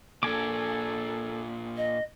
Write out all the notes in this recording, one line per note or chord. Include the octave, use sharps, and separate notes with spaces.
A#2 D4 A4 G#5 D6
D#5